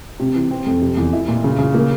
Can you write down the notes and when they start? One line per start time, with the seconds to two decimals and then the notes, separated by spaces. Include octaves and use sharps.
0.20 C3
0.35 E3
0.51 C4
0.66 F2
0.82 C3
0.97 E2
1.13 E4
1.28 A#2
1.44 C#3
1.59 C#3
1.74 A#3